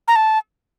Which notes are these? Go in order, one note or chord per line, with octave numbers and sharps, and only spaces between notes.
A#5
A5